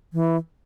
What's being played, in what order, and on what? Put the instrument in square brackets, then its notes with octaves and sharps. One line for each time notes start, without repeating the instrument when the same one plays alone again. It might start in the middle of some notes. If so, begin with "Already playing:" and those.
[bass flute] E3